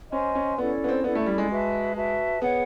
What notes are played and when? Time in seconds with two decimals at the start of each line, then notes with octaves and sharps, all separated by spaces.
0.12 C#4 C5 D#5 G#5 C6
0.35 C#4
0.58 B3 C#4 E4 A4 D5
0.84 B3
0.89 C4
1.04 B3 C#4 E4 A4 D5
1.15 A3
1.26 G3
1.38 G#3
1.50 F#4 B4 E5 A5
1.95 F#4 B4 E5 A5
2.41 B3 G#4 C#5 F#5